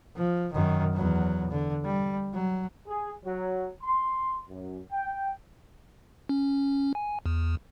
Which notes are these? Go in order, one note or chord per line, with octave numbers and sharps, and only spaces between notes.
F3
F#2 D#3
E2 F#3
D3
G3
F#3
G#4
F#3
C6
F#2
G5
C#4
G#5
E2